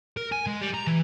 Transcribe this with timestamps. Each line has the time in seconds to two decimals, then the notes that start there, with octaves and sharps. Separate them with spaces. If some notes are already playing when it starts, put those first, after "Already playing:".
0.17 A#4
0.32 G#5
0.47 G#3
0.61 G3
0.74 A#5
0.87 E3